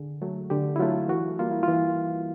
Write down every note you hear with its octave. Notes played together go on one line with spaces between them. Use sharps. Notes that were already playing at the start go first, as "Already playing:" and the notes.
Already playing: D3 G#4
F#3 A3
D3 G4
E4
F#3 A3 F4
E3 F#4
G3 A#3 F4
E4
F4
E3